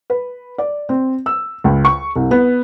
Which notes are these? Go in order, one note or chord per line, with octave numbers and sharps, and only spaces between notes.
B4
D5
C4
E6
C#2
C#6
C2
B3